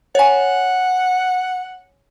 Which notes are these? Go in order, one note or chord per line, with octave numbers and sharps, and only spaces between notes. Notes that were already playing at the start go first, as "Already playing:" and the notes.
C#5 F#5 G#5